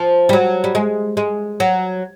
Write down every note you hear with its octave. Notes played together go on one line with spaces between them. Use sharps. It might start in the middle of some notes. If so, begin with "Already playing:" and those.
Already playing: F3
G3
F#3
G3
G#3
G#3
F#3